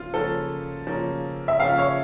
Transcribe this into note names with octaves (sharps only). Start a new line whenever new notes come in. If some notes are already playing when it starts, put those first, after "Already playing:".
Already playing: C#3 F3 A#3 F4
C#3 F3 A#3 C#4 A4
C#3 F3 A#3 C#4
E5
C#3 F3 A#3 C#4 F5
C#5